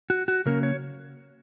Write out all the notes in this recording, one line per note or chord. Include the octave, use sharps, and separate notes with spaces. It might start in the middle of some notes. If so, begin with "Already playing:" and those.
F#4
F#4
C#3 F#3 A#3 C#4 A#4
C#5